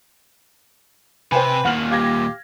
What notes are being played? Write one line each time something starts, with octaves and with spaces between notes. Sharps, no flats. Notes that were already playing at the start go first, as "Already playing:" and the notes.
C3 B4 C5 G5 G#5
D#2 A#2 F#5 F6 F#7
G4 F5 G#6 A#6